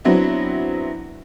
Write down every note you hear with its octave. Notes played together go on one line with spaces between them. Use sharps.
F#3 B3 C4 D4 E4